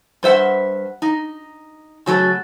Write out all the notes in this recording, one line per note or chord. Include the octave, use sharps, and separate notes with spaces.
G2 C5 E5 F#5
D#4
C#3 F#3 A3 A4